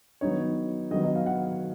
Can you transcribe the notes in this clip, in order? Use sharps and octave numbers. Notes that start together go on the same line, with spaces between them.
D#3 F#3 B3 D#4 C#5
D#3 F#3 B3 D#4 D#5
D#5
F5
F#5